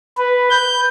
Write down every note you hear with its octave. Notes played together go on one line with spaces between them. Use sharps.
B4
G6